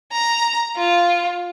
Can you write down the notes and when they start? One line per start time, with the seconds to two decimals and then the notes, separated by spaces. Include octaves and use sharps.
0.12 A#5
0.77 F4